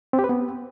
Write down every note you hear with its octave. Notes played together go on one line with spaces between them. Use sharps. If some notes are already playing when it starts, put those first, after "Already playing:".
C4
G4
B4
B3